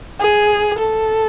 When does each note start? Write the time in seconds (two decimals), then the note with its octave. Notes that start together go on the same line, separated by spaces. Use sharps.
0.20 G#4
0.78 A4